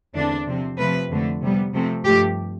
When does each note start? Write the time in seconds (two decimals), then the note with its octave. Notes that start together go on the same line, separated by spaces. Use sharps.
0.14 E2 D3 A3 C4 D4
0.47 C3 F3 C4
0.78 C3 F3 A3 C4 B4
1.10 F2 D3 A3
1.42 C3 G3 B3
1.73 C3 F3 A3 C4
2.06 G2 F3 A3 G4